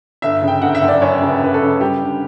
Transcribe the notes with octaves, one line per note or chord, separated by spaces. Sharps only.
G1 E5
C#3
G5
G1 F#5
E5
F#2
D5
F#2 C#5
C#3
B4
F#2 B4
A4
C#3
G3 G4
D3